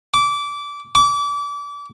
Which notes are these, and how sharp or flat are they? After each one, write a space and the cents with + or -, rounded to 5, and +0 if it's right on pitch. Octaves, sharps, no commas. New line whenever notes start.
D6 -20
D6 -30